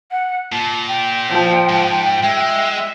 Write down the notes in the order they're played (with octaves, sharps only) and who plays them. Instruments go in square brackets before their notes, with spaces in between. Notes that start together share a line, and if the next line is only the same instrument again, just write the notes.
[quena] F#5
[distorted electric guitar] A#2 [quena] A5
[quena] G5
[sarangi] F3
[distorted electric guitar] G#2
[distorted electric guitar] G#3 [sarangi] E5